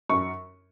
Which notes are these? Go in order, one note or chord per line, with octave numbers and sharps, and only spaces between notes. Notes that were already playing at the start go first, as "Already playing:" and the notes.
F#2 C#6